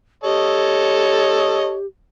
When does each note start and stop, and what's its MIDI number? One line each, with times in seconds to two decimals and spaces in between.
0.24 1.86 67
0.24 1.74 69
0.24 1.74 73
0.24 1.74 75